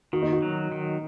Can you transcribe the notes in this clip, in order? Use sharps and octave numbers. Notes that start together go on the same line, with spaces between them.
D#3 F#4
D#4
F#4
F#3
D#3